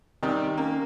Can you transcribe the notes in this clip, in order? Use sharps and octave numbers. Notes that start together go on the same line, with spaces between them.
C3 D#3 G3 G4
A#3 C#4